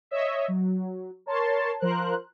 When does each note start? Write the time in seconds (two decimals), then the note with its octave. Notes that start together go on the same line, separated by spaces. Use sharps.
0.11 C#5 D#5 E5
0.48 F#3
1.26 A#4 C#5 A5 C6
1.80 F3 A#4 C5 F#6